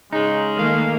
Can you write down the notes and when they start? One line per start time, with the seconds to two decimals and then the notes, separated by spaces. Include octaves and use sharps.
0.13 C#3 G#3 D#4
0.57 D#3 A3 A#3 F5